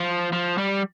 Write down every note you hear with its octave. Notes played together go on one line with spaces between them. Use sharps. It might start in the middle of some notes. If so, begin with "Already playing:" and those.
Already playing: F3
F3
G3